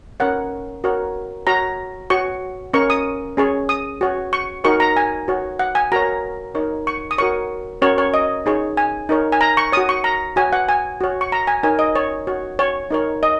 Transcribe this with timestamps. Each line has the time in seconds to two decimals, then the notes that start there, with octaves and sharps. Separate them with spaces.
0.20 C#4 A#4 C#5 F#5
0.84 F#4 A#4 C#5
1.47 F#4 C#5 A#5
2.10 F#4 C#5 C#6
2.74 C#4 A#4 C#5 C#6
2.90 D#6
3.37 C#4 G#4 C#5
3.69 D#6
4.01 F#4 C#5
4.33 C#6
4.64 D#4 F#4 A#4 C#5 C#6
4.80 A#5
4.97 G#5
5.28 F#4 C#5
5.59 F#5
5.75 G#5
5.92 F#4 A#4 C#5 A#5
6.55 D#4 A#4 C#5
6.87 C#6
7.11 D#6
7.18 F#4 A#4 C#5 C#6
7.82 C#4 F#4 A#4 C#5
7.98 C#5
8.14 D#5
8.46 D#4 G#4 C#5
8.77 G#5
9.09 D#4 A#4 C#5
9.32 G#5
9.41 A#5
9.57 C#6
9.72 F#4 C#5 D#6
9.89 C#6
10.04 A#5
10.36 F#4 C#5 G#5
10.53 F#5
10.69 G#5
11.01 F#4 C#5
11.21 C#6
11.32 A#5
11.47 G#5
11.63 D#4 A#4 C#5 G#5
11.79 D#5
11.95 C#5
12.27 F#4 C#5
12.59 C#5
12.91 D#4 A#4 C#5
13.23 D#5